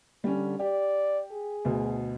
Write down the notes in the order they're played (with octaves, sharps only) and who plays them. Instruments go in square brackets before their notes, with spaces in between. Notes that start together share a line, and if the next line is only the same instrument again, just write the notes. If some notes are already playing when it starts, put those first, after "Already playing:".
[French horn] D3 [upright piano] G3 C#4
[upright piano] G4 [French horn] D5
[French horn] G#4
[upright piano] D2 B2